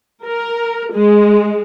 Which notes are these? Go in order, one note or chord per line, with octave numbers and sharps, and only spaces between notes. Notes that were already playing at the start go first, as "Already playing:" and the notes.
A#4
G#3